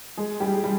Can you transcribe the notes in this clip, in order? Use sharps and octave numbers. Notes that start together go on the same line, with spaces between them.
G#3 G#4
G3 G4
G#4
G3